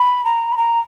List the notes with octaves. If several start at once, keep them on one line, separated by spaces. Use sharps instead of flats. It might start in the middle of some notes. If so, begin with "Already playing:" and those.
Already playing: B5
A#5
B5
A#5